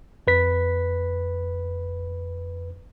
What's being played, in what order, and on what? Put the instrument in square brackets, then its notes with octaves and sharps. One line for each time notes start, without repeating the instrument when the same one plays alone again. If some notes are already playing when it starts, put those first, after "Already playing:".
[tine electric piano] F2 B4 B6